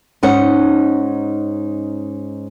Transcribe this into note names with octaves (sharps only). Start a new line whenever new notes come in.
G#2 C#4 D#4 F#5